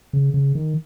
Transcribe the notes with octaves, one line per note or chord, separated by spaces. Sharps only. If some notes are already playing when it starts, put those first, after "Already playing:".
C#3
C#3
D#3